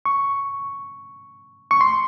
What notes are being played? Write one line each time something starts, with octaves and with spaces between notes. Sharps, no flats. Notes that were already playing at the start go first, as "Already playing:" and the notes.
C#6
C#6
C6